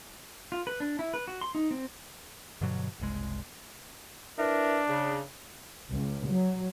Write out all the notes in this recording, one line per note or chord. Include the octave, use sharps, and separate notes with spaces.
F4
B4
D4
E4
B4
F#4
C6
D#4
C4
G2 B2 D3 F#3
F#1 C2 G#3
D4 E4 A#4 B4
C#3
C#2
F#3